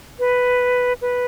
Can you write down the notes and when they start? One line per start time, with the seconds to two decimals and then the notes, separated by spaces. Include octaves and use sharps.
0.19 B4
1.01 B4